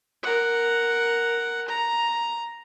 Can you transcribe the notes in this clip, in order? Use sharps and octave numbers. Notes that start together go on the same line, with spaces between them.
A#4 F#5
A#5